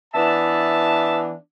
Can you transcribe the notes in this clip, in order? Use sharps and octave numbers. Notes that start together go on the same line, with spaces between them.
E3 B3 D4 E5 A5